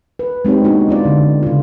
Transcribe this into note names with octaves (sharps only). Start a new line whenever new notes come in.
B4
G#3 C4 D#4 G4 C#5
A#3 B3 D4 D#4 F#4
C4 E4 F4 D5
D3
C#3 F4